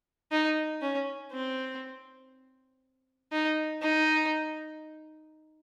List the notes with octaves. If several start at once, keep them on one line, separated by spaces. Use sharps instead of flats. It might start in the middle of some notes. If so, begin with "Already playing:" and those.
D#4
C#4
C4
D#4
D#4